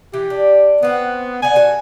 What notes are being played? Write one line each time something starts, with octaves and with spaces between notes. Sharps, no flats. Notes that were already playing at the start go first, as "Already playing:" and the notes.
E3 G4
D4
B3 C4 F#4
D3 F#5 G#5
F#4 A4